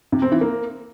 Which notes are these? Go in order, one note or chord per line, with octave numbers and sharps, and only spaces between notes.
C3
C4
E3
A#3